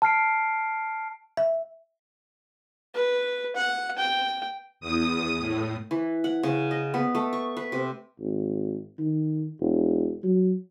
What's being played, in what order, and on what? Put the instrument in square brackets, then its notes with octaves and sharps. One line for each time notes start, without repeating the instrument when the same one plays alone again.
[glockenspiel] A5 F6 C7 D7
[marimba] E5
[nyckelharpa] B4
F#5
G5
[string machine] E2 D#6
A2
[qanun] E3
F#5
C#3
D#5
B3
A3
C#6
B4
C3
[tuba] G#1
D#3
E1
F#3